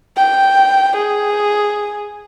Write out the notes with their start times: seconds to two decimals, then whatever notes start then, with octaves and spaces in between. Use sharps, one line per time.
0.16 G5
0.96 G#4